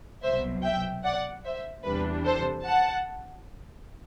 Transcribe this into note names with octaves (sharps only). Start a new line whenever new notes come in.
C2 B2 F#3 C5 E5
E5 G5
D5 F#5
C5 E5
E2 C3 E3 G3 D4 B4
A4 C5
F#5 A5